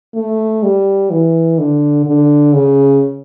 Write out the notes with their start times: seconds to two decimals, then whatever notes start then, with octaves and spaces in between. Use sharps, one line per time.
0.15 A3
0.63 G3
1.11 E3
1.58 D3
2.06 D3
2.54 C#3